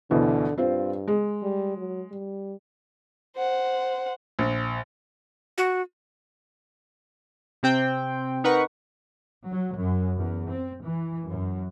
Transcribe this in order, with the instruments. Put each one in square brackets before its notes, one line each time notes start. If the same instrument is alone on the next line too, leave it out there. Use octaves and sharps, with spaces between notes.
[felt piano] D2 B2 E3 [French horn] D3
[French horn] G2 [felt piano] C4 F4 C5
[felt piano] G#3
[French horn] G3
F#3
G3
[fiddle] C5 F#5
[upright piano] A#1
[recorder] F#4
[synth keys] C3 C4 G5
D#4 A#4 B4 F#5 C#6
[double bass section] F#3
F#2
E2
C4
E3
F#2